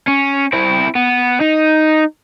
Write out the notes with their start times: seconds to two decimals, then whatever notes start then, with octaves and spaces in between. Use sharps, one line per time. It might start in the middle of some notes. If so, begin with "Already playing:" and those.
0.07 C#4
0.53 C4 E4
0.95 B3
1.41 D#4